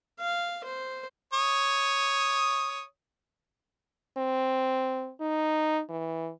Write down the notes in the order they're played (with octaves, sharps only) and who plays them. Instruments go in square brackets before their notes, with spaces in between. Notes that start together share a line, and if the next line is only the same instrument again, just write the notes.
[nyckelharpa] F5
C5
[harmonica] C#5 D#6
[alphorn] C4
D#4
E3